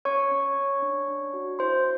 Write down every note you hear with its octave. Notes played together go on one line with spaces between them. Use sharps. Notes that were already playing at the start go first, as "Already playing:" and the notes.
C#4 C#5 C#6
C#4
C#4
D4
D4
F#4
E4 C5 C6